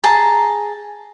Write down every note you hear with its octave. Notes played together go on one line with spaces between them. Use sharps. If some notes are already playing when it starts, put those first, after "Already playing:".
G#4 A5 A#5